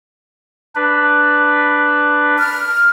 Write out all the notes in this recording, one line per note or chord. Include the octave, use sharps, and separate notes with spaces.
D4 B4
F6